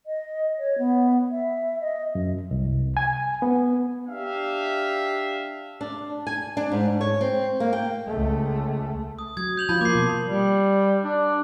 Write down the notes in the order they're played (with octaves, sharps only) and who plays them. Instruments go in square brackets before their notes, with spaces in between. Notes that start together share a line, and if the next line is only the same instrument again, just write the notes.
[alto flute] D#5
C#5
B3
E5
D#5
[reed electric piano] F#2
C2
G#5
B3
[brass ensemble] D4 G4 E5 F5
[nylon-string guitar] D4
G#5
D4
G#2
C#5
C4
A#3
G5
[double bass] C#2 A3
[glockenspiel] D#6
[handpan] F#3 [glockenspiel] D#6 G#6
[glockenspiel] G6 F7 F#7
[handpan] F3 F4 [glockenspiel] A5 B5 G6
[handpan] A#3 [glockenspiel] D6 C7
[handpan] B2
[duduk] G3
D4